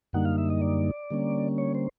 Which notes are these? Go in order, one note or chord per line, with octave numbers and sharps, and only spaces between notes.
F#2 D3 G3 A#3 D#4 F#5
F5
E5
D#5
D5
D3 G3 A#3 C#4
C#5
C5